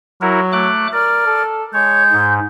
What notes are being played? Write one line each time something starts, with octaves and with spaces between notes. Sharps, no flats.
F#3 E4 F#4 A#4
A3 D6 F#6
A#4 D5 F6
A4
G#3 C#5 G6
G#2